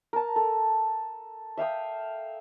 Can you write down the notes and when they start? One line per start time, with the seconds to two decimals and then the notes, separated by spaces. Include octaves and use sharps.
0.13 A#4 A5
0.36 A4
1.57 E5 F5 G5 D#6